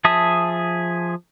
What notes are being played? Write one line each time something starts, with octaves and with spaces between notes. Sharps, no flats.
F3 G#4 E5 A5 D#6